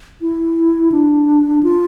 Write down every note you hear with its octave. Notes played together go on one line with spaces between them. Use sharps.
E4
D4
F4